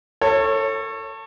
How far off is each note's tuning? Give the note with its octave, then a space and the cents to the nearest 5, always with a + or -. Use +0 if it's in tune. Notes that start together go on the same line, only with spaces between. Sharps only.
A4 +25 C#5 -15